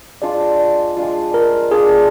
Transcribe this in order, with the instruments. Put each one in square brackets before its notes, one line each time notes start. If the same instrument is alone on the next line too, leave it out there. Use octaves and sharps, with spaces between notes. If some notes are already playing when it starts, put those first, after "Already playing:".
[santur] G#3 D4 F4 [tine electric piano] D5
[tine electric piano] D5
[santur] G#3 D4 F4
[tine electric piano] A#4
[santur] G#3 D4 F4 [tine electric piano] G#4